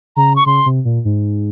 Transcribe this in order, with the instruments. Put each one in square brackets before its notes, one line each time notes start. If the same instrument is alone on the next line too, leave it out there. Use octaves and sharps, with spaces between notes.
[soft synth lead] C#3 [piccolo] A#5
[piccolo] C#6
[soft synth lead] C#3 [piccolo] C6
[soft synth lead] C3
A#2
G#2